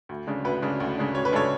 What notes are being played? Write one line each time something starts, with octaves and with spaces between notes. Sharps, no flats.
D2
C#3 G#3 D4
D2 B4
C#3 G#3 D4
D2
C#3 G#3 D4
D2 C#5
B4
C#3 G#3 D4 A4 C#5